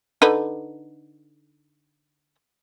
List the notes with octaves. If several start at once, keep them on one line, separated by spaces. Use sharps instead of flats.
D3 D#4 B4